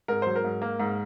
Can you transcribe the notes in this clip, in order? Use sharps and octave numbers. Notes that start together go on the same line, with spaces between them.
G#2 A#4
F#3 C5
A#4
G#2
A#3
G#2